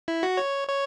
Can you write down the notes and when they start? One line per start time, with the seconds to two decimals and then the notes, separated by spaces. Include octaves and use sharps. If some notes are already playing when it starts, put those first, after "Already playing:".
0.08 E4
0.23 F#4
0.37 C#5
0.68 C#5